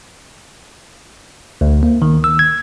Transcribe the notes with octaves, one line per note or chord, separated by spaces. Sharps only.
D2
A#3
D#3
E6
G#6